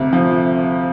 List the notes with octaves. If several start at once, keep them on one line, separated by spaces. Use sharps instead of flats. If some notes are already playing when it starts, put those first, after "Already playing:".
Already playing: D2 C3
F3